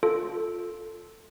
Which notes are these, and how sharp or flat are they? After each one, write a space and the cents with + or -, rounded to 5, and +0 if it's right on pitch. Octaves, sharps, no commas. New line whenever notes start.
F4 +15 A4 +0